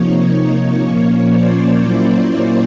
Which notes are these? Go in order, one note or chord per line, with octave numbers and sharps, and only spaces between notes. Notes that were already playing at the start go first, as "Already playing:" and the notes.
Already playing: C3 F3 A#3 D#4 C#5
C#5
A#2 F3 A#3 C#4
C5 D5
A#2 F#3 A#3 C#4 E4